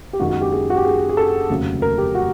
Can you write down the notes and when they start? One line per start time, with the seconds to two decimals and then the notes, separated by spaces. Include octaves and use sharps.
0.13 G4
0.19 F#1 F#2 D#3 G#3 F#4
0.30 F#4
0.41 G4
0.52 G#4
0.70 F#4
0.77 G4
0.85 G#4
1.09 G#4
1.17 A4
1.50 F1 D#2 C#3 F#3
1.82 A#4
1.98 G4
2.15 F#4